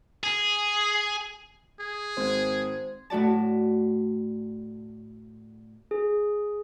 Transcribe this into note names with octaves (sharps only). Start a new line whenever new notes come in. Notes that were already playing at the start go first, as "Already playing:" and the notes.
G#4
G#4
G#1 C5 G#6
A2 A3 F#4 D5 A5
G#4